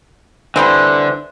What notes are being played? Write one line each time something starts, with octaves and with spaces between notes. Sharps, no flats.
D3 E3 G3 C4